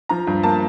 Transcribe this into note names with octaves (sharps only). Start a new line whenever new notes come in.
F3 A#5
G2
A#3 A5